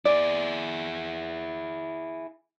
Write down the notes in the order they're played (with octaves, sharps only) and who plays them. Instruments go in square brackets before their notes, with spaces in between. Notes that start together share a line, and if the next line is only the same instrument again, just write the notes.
[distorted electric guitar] E4 G#4 [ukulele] D5